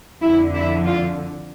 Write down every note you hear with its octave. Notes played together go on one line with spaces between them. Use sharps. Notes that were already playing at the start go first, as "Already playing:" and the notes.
F2 D3 E4
E4
F4